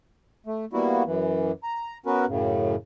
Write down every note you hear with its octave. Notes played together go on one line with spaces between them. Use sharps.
A3
G3 A#3 B3 E4 F#4
F#2 E3
A#5
B3 C#4 F#4 A#4 B4
F#2 A2 C#3